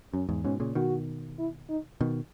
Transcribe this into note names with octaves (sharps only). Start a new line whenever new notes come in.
F#2 C#4
E2 G#2
G#2 B2 C#4
A#2 C#3
B2 D#3 F#4
E4
D#4
B2 D#3